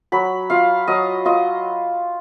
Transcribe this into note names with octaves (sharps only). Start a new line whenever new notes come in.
F#3 B5
F4 F5
F#3 D#5
F4 D#5